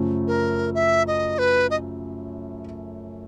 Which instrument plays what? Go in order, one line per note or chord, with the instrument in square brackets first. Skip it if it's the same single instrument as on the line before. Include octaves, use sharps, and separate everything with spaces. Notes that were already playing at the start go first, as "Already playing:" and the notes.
Already playing: [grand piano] F#2 C#3 F3 A3
[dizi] A#4
E5
D#5
B4
D#5